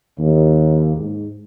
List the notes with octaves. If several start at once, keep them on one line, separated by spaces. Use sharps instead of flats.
D#2
G#2